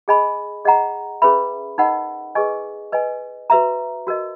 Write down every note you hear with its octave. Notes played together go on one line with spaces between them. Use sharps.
G#4 D#5 G#5 B5
G#4 D#5 F#5 A#5
C#4 G#4 B4 E5 B5
D#4 A#4 D#5 F#5 B5
G#4 B4 D#5 G#5 C#6
B4 D#5 G#5
F#4 B4 E5 A#5
F#4 A#4 D#5